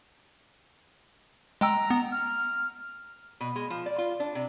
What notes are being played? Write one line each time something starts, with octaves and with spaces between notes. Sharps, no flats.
G#3 G5 A#5 E6
B3
F6
B2
G#3
F3
D5
F4
D4
C3